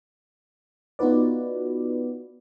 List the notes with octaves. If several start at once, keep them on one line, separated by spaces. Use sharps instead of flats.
B3 D#4 F4 F#4 B4 D5